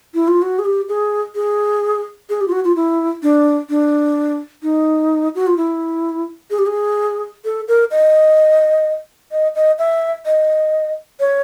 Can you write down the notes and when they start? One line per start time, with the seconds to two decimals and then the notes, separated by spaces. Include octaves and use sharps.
0.14 E4
0.28 F4
0.42 F#4
0.59 G#4
0.65 G4
0.89 G#4
1.35 G#4
2.30 G#4
2.41 G4
2.48 F4
2.52 F#4
2.64 F4
2.76 E4
3.23 D4
3.70 D4
4.63 D#4
5.35 F#4
5.47 F4
5.57 E4
6.51 G#4
6.59 G4
6.67 G#4
7.45 A4
7.68 A#4
7.91 D#5
9.32 D#5
9.55 D#5
9.79 E5
10.26 D#5
11.20 C#5